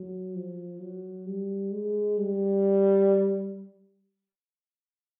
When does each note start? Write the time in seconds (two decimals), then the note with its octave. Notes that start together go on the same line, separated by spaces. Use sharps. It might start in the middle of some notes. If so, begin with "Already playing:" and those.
Already playing: F#3
0.35 F3
0.80 F#3
1.27 G3
1.72 G#3
2.18 G3